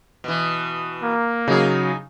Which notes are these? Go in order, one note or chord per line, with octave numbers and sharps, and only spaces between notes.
B2 E3
A#3
C#3 F#3 D#4 G#4